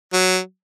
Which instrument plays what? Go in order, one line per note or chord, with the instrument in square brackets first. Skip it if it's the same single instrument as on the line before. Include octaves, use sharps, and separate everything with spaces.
[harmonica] F#3